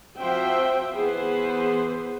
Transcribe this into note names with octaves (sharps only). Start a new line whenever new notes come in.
F3 C4 F#4 C5 E5 G5
E3 B3 G#4 B4 C5